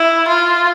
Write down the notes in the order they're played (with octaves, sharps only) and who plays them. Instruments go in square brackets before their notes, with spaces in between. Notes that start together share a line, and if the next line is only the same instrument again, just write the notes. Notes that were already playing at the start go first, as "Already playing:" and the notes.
Already playing: [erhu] E4
F4